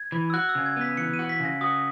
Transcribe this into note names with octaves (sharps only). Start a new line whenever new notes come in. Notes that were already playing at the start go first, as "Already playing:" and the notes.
Already playing: G#6
E3
E6
F#4 F#6
E6
C#3
G#6
B3 B6
E3 C#7
D#7
F#4
B6
C#3 A#6
F#4 D#6